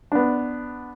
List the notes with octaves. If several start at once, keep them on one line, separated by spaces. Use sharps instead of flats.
B3 D4